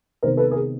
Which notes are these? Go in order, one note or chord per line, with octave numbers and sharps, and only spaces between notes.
C3 D#3 G#3 B3 D#4 A#4 C5
A4 B4
G#4 A#4